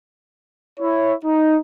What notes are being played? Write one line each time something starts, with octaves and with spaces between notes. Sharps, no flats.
E4 C#5
D#4